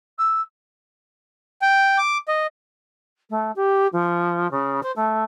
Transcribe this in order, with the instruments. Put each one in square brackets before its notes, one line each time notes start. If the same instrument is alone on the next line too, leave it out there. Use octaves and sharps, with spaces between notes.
[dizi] E6
[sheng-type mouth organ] G5
D6
D#5
[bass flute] A3
G4
F3
C#3
C5
A3